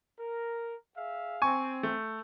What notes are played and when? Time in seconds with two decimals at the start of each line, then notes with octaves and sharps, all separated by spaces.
0.19 A#4
0.96 G#4 E5 F5
1.42 C4 G#5 C#6
1.83 A3